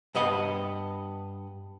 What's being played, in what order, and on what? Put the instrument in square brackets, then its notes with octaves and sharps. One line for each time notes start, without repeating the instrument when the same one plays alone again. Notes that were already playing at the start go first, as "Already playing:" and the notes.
[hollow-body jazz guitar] G2 B3 D#5 B5